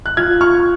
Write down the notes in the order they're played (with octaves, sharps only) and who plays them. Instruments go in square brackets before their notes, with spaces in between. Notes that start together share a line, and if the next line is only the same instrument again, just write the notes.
[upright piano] F#6
[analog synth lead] F4 [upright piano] F6 G#6
[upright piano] C#6 F6